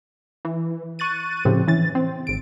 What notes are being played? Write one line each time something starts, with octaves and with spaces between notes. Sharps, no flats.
E3
C#6 F#6 A6 D#7
A2 C#3 F3 C4 G4
E3 C#4 A6
C4
G#1 D7